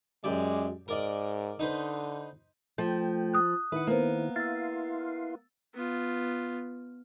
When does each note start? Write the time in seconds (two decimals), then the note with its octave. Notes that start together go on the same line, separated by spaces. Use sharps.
0.24 F#2 G#3 G4 D5
0.88 G#2 A#4 D5 D#5
1.59 D3 D#4 B4 C5
2.78 F3 A3 G5
3.34 D#6 F#6
3.72 D#3 E4 B4 F#5
3.87 A#3 B3 B4 C5
4.36 E4 F5 C6 E6 A6
5.75 B3 F4